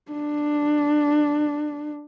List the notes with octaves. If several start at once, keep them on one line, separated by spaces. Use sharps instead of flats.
D4